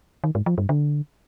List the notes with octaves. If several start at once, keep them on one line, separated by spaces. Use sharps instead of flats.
D#3
G#2
F3
G2
D3